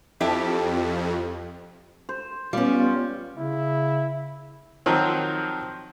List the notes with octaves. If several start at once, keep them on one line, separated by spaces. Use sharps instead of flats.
F2 E4 G4 A4
C5
G3 B3 C#4 F4
C#3 E4
D#3 F3 F#3 C4